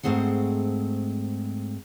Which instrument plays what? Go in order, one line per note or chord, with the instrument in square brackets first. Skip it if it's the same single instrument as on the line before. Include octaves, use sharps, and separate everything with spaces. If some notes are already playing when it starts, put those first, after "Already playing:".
[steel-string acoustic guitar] G#2 A3 C4 G#4 F#5